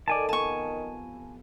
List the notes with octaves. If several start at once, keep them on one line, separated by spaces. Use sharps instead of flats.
D#3 A4 C5 D5 G#5 A5
C3 F3 B3 G#5 A5 C#6